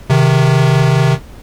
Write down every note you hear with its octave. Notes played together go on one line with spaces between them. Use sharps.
C3 D#3